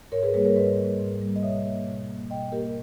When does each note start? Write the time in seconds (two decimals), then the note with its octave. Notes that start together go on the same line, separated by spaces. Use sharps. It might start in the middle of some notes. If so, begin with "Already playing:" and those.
0.12 G#2 A#4 C#5
0.23 G#4 B4
0.34 G3 A#3 G#4 B4
0.45 A#4 C#5
0.55 G#2 B4 D#5
0.77 A#3
0.82 G3
0.99 G#2
1.21 G3 A#3
1.36 D#5
1.43 B2 C#5 E5
1.66 A#3
1.87 B2
2.08 A#3
2.30 B2 D#5 G5
2.52 A#3 G4 A#4